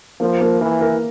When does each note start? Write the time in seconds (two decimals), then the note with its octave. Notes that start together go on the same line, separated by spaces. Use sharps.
0.20 F3 A#3
0.41 A#3
0.61 E3 A#4
0.81 A#4